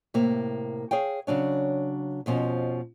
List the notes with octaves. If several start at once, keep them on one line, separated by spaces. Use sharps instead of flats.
A2 C3 A#3
G#4 C#5 F5 G5
C#3 F#3 D4 C#5
F2 B2 F3 C#4